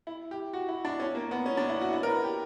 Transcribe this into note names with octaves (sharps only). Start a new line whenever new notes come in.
E4
G4
F#4
E4
D4
C#4
A#3
B3
C#4
D4
E4
F#4
E4
A#4
B4
G4